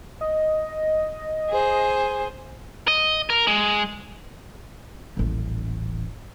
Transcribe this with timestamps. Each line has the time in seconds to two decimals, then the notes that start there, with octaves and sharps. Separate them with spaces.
0.21 D#5
1.49 G#4 C5
2.88 D#5
3.30 A#4
3.47 G#3
5.17 D#1 A1